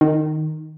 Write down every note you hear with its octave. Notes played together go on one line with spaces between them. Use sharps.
D#3